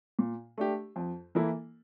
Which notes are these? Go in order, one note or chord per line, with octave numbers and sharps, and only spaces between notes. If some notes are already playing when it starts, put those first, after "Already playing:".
A#2
A3 D4 G4
F2
E3 A#3 E4 A4